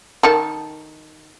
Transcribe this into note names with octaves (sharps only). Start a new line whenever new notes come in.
D#3 A4